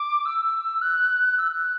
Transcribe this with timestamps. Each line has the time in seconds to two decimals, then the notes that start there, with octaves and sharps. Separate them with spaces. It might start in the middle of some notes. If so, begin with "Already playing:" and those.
Already playing: D6
0.25 E6
0.82 F#6
1.38 E6
1.52 F#6